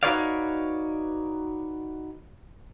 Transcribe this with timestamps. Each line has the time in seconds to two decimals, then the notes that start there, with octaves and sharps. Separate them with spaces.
0.03 D#4 F#4 B4 C#5 D5 F5